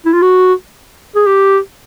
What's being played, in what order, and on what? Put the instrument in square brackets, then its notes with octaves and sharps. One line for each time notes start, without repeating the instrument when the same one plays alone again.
[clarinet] E4
F4
F#4
G#4
G4